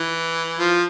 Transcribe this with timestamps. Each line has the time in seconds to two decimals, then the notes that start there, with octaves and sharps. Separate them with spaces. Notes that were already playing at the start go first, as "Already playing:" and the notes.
Already playing: E3
0.59 F3